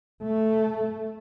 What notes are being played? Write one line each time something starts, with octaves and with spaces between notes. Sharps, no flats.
A3